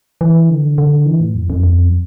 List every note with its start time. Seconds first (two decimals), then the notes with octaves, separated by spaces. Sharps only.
0.21 E3
0.49 D3
0.78 D3
1.06 E3
1.20 A2
1.35 F2
1.50 F2
1.63 F2